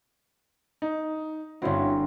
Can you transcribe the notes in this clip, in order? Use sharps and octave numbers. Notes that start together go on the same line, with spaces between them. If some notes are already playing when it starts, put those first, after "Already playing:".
D#4
G1 C4 C#4 E4 F#4